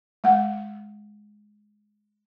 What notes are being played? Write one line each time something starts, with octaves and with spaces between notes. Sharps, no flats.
G#3 F#5